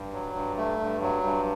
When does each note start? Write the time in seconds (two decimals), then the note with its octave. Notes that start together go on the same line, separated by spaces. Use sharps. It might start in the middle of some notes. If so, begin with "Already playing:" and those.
Already playing: G2
0.13 F#3
0.34 G2
0.57 A3
0.79 G2
1.01 F#3
1.24 G2